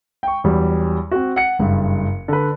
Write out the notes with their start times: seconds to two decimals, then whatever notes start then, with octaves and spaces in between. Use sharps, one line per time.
0.23 G5 C#6
0.44 E2 F#3 G3
1.11 C4 F#4
1.36 F#5 C#7
1.59 F#1 G2
2.28 D3 B4